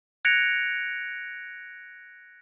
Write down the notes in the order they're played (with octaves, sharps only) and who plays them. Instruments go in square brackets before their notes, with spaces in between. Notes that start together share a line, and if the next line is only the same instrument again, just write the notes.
[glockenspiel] F#6 G#6 A#6 C#7 D7 F7